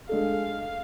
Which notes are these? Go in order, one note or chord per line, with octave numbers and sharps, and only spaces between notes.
G#3 D4 A4 F5